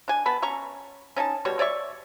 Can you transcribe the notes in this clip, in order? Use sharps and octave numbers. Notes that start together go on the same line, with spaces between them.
D4 G#5
B3 A5 B5
C#4 A#5 C#6
C#4 D#4 G#5 A5
B2 G3 C#5
C#5 D5 E5 C#6